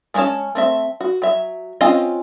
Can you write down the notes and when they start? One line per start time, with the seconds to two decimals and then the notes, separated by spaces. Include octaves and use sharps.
0.14 G#3 A#3 C#4 C#5 A5
0.55 A3 C4 E5
1.00 F#4
1.22 F#3 E5
1.81 C4 C#4 F4 D#5 F5